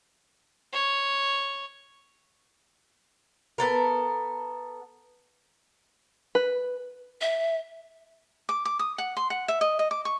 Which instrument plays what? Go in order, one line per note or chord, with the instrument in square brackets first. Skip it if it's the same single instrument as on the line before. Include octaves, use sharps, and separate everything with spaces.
[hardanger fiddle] C#5
[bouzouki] B3 A4 A#4
[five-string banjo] B4
[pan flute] E5
[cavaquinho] D6
D6
D#6
F#5
C6
F#5
E5
D#5
D#5
D6
C#6